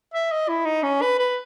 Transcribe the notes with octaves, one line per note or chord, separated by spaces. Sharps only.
E5
D#5
E4
D#4
C#4
B4
B4